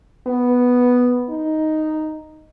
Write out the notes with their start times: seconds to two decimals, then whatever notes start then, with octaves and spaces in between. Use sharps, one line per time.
0.27 B3
1.30 D#4